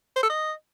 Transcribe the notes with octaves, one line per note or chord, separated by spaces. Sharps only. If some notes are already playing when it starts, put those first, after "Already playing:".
C5
A4
D#5